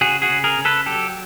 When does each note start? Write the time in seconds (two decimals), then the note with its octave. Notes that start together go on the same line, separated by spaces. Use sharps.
0.01 C#3 F#4 G#4
0.22 F#4 G#4
0.29 C#3
0.44 G#4 A#4
0.59 C#3
0.65 A4 B4
0.86 F#3 G4 A4